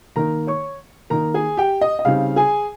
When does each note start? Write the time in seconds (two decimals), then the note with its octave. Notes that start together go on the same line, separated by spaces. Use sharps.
0.16 D#3 A#3 D#4 A#4 A#5
0.47 C#5 C#6
1.10 D#3 A#3 D#4 A#4 A#5
1.34 G#4 G#5
1.57 G4 G5
1.81 D#5
1.99 D#5
2.05 C#3 G3 C4 D#4 F5
2.36 G#4 G#5